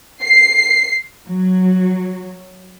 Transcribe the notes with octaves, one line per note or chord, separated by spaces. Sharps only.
C7
F#3